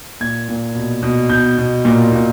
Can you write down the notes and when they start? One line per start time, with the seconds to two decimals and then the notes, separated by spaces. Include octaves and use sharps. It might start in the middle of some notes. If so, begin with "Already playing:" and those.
0.20 A#2 G#6
0.49 A#2
0.75 B2
1.03 B2
1.30 B2 G6
1.58 B2
1.85 A#2
2.12 A#2